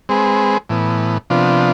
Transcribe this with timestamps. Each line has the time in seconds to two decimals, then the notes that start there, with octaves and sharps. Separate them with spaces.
0.09 G#3 C4 G#4 B4
0.69 A2 E3 B3
1.30 C3 F3 B3 D4 F4